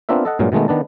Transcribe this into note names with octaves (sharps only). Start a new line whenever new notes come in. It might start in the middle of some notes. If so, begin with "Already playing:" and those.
B3 C4 D4 F4 A#4 E5
A4 D#5 F#5
G2 A#2 F#3 G#3
B2 D#3 G#3 A3 B3
D#3 B3 D4 A5